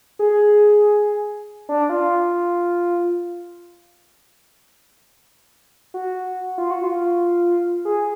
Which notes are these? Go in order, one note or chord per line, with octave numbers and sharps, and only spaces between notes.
G#4
D4
F4
F#4
F4
F#4
F4
G#4